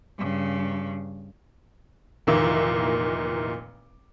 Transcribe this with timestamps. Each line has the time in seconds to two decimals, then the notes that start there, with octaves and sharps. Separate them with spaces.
0.19 G2 C#3
2.27 F1 A#2 D#3 E3 A#3 E4